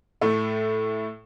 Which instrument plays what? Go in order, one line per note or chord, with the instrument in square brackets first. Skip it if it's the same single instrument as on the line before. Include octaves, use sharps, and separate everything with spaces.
[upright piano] A2 A3